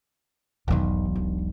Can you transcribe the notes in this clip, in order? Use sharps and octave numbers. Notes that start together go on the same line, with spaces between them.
E1 B1 E2 D#3
D4